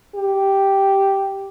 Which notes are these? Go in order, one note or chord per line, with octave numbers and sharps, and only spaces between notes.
G4